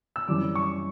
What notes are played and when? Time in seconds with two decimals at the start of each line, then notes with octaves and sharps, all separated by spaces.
0.16 E6
0.28 F#2 E3 G3 D6
0.55 C#6